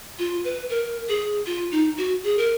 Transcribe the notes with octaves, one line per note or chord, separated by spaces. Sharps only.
F4
B4
A#4
G#4
F4
D#4
F#4
G#4
A#4